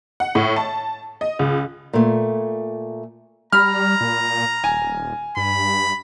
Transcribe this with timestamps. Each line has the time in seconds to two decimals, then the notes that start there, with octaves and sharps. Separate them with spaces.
0.20 F#5
0.35 A2
0.56 A5
1.21 D#5
1.39 C#2
1.93 A#2 A3
3.52 G3 A#5 B5 F6
4.01 A#2
4.64 D#1 G#5
5.37 G2 B5